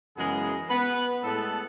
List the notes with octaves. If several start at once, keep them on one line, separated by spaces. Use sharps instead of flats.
F#2 C#3 E3 G#3 B3 G#4
B3 B4
A2 G#3 A3 B3 A4